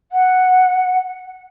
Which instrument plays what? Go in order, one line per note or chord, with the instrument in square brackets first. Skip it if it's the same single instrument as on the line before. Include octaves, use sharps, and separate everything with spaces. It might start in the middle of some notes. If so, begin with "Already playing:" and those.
[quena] F#5